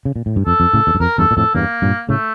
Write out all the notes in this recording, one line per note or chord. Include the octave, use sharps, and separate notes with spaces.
C#3
A#2
A2
G2
F2 A4
F2
A2 C#3
E2
G2
F2 A#4
E2 G2 A4
A#2
F2 A2 A4
E2 G2 A#3
G2 A#2
A2 C#3 A3